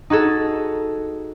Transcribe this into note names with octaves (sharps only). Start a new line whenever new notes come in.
D#4 F#4 G#4 A4